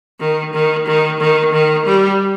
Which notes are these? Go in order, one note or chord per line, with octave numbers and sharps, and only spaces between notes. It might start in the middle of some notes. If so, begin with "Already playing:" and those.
D#3
D#3
D#3
D#3
D#3
G3